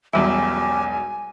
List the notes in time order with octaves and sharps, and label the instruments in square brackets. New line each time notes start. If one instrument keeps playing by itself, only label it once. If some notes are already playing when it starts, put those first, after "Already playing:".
[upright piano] E1 B1 E2 [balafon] G3 [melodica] C#4 G4 [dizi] G#5